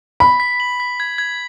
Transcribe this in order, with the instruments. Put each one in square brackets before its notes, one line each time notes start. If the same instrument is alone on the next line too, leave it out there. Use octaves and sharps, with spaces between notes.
[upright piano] B5 [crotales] B6
[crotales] B6
F#7
B6
G#6
G#6